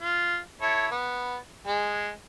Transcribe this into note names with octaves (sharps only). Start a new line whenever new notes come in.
F4
E4 A4 C#5
B3
G#3